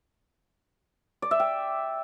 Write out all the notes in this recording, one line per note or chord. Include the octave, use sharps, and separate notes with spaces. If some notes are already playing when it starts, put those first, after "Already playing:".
D5
E5
G5